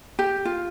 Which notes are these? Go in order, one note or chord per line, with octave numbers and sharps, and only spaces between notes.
G4
F4